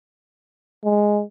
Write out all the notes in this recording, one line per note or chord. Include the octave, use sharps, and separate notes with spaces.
G#3